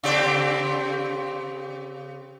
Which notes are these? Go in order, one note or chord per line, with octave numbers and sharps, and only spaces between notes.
C#3 C4 G4